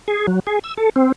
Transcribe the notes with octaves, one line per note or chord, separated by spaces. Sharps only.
G#4
F#3
G#4
E6
A4
C4